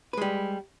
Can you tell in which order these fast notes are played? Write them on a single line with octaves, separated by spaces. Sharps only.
B4 G#3 G3